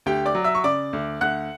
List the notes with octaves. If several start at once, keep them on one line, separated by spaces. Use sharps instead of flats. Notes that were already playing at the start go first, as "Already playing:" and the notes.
D2 G4 G5
D5 D6
F#3
E5 E6
C#6
C#3 D5 D6
D2
D2 F#5 F#6